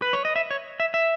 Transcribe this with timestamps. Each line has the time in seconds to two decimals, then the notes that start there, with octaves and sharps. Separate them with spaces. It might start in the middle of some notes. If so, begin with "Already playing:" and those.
0.02 B4
0.13 C#5
0.25 D#5
0.36 E5
0.51 C#5
0.80 E5
0.94 E5